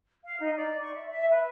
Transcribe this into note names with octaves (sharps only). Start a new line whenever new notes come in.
F5
D#4
D5
C#6
E5
E5
B4